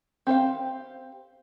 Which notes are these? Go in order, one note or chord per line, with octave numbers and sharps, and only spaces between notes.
C4 G4 C5 F5